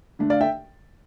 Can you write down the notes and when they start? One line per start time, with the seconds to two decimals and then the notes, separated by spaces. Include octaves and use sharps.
0.19 D3 A3 D4
0.30 D5 F5
0.41 E5 G5